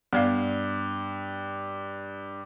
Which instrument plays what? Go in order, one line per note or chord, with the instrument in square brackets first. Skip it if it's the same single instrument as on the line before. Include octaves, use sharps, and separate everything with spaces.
[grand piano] G2 [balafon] B3 D5 F5